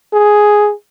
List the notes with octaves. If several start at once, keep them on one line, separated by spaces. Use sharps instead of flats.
G#4